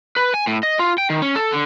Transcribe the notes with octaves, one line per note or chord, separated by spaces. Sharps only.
B4
G#5
A2
D#5
F4
G5
D#3
C#4
A4
D3